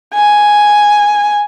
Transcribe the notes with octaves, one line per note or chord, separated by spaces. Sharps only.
G#5